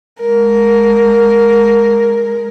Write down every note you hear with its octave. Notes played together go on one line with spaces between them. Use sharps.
G#3 A#4